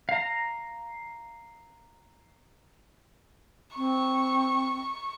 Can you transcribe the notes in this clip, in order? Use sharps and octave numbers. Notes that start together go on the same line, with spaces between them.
F5 A#5
C4 C#6